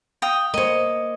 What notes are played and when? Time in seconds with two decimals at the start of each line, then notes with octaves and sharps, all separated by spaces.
0.22 F5 G5 D#6
0.54 A#3 C5 C#5 D#5